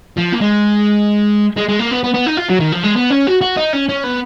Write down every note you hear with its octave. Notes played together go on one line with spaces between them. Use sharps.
F3
A#3
G#3
G#3
G#3
A#3
B3
B3
B3
D#4
F4
F#3
D#3
F3
G#3
B3
C#4
F#4
F#4
D#4
C#4
C#4
B3